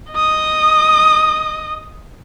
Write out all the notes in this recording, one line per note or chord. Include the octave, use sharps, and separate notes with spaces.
D#5 D#6